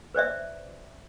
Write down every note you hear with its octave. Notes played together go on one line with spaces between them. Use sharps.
B4 C5 D5 E5